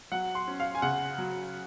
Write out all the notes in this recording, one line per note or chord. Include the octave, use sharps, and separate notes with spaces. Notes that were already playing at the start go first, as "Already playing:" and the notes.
F#3 F#5
C6
C#4
F5
G#5
C#3 F#5
F#3